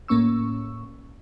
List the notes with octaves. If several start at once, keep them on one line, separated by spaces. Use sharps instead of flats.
A2 A#3 C#4 C#6 E6